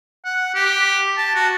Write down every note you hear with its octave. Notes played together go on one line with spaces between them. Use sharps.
F#5
G4
A5
F#4